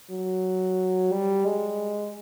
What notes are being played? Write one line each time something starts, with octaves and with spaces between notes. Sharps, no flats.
F#3
G3
G#3